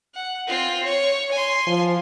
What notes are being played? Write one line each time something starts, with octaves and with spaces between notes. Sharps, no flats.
F#5
C4 F4
C#5
G#5 C6
F3